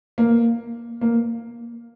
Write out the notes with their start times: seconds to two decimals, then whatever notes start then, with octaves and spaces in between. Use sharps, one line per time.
0.18 A#3
1.01 A#3